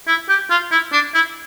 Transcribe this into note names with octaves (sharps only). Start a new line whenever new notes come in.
E4
G4
F4
E4
D4
E4